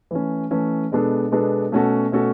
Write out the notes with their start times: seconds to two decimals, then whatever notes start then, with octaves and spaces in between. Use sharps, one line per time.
0.11 E3 A3 C#4
0.51 E3 A3 C#4
0.92 B2 G#3 B3 D4 A4
1.32 B2 G#3 B3 D4 A4
1.72 B2 A3 C#4 F#4 A4
2.12 B2 A3 C#4 F#4 A4